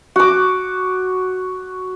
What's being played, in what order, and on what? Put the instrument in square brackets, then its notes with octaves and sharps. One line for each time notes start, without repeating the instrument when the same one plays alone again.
[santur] F#4 D6